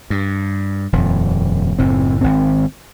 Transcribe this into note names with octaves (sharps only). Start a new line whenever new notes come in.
G2
D#1 F2
F#1 A2 C4
G#1 C4